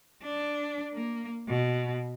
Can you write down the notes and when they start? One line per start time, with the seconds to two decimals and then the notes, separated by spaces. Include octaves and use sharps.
0.24 D4
0.94 A#3
1.48 B2